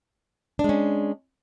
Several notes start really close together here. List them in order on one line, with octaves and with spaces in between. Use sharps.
D4 G#3 C#4